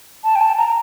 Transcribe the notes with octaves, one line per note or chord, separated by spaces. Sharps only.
A5
G5
A5
A#5